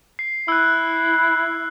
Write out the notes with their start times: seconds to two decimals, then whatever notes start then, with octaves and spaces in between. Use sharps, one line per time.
0.19 C7
0.48 E4 E6 F#6